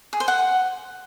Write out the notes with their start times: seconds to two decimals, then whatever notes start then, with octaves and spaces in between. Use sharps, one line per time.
0.13 G#4
0.20 C5
0.28 F#5